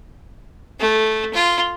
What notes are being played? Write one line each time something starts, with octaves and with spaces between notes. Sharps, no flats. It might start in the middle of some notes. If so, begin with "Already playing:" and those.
A3
F4